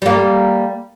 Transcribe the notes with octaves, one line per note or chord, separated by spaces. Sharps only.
G3 A#3